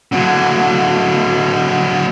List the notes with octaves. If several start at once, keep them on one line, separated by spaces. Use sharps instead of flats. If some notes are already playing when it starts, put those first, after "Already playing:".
D3 F#3